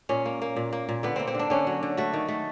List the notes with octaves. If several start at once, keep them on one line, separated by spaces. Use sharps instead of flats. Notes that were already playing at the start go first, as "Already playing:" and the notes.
A#2 C#4
A#3
A#3
A#2
A#3
A#2
D3 B3
A#3 C4
C4
D3 D4
D3 C#4
F#3
D3
A3 F#4
D#3
A3